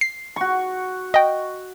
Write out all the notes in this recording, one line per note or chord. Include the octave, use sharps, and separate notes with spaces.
C7
F#4 C#6
D#5 G5